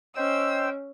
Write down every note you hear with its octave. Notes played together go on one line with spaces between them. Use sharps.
C#4 C5 D#5 G5 E6